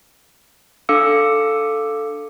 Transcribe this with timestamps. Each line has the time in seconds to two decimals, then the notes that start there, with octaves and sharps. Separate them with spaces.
0.89 D4 A4 F5 D6 E6 C#7